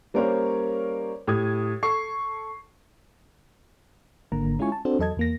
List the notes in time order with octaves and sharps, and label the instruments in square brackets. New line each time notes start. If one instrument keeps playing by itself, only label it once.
[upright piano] G3 A#3 C#4 A#4 C5 C#5
A2 G4 D#6 G#6
A4 C#6 C7
[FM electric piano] G#1 D3 A#3 A#5
G#3 C#4 E4 F4 G#5 C#6
A5
C4 D4 F#4 A4 C5
E2 F#3 A4 D#5 A5 G#6
E2 A#3 A#6